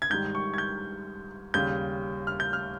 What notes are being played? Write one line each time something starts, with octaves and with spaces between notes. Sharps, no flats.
G#6
G#2 D#3 G3 G6
C#6
G#6
G6
D#2 C#3 G3 G6
F6
G6
F6